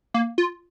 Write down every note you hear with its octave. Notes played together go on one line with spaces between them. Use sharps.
A#3
F4